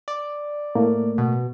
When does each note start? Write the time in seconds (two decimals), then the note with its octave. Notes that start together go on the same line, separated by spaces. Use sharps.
0.08 D5
0.75 A2 A3 A#3
1.18 B2